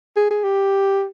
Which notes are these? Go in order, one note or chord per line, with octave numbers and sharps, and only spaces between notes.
G#4
G#4
G4